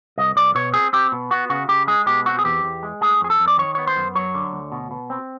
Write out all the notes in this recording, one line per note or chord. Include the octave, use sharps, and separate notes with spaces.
C2 D#5
C2 D5
B2 C#5
C4 G#4
C4 G4
B2
B3 F#4
C#3 F#4
C#3 G4
G#3 G#4
B2 G4
C4 F#4
G#4
E2 G4
E2
G#3
A3 G#4
F2 G#4
A4
F2
D5
D#3 C#5
B3 C#5
C5
F#2
F#3 C#5
D3
D2
B2
B2
C4